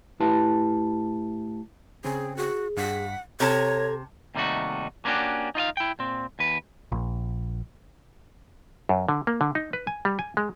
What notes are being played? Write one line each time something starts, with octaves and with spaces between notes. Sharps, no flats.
A2 E4 G4 B4 A5 C6
C#3 C4 G#4
F#4 G#4
G2 F#5 B6
C3 A4 C#5 A5 A#5 G#6
D#2 C3 G3 A3 D#4 F#4
A#3 B3 C#4 D4 F#4 G4
D#4 F4 D#5 F5
E4 G5
A#2 C4
D#2 B4
A#1
F#2
D3
A#3
D3
D#4
B4
G#5
G3
G#5
G#3